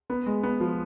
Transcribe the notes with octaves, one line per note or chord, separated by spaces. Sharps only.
B3
G#3
B3
F3